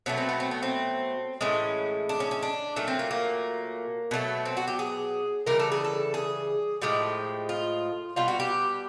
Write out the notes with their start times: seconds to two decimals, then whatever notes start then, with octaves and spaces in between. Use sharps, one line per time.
0.06 B2 F#3 A3 C#4
0.17 C4
0.29 B3
0.40 C4
0.51 B3
0.63 C4
1.41 A2 E3 G#3 C#4
2.09 D4
2.20 C#4
2.31 C#4
2.43 D4
2.76 A#2 F#3 A3 C#4
2.88 C4
2.99 A#3
3.11 A#3
4.11 B2 F#3 A3
4.45 C4
4.57 F#4
4.68 G4
4.79 G#4
5.46 C#3 E3 G3 A#4
5.60 A4
5.72 G#4
5.85 A4
6.14 G#4
6.82 A2 F3 G#3 G4
7.49 F4
8.16 B2 G3 F4
8.28 F#4
8.40 G4